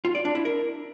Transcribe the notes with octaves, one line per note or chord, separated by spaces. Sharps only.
F4
D5
D4
E4
A#4